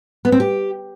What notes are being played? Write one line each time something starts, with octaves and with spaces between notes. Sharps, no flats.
B3
C4
G4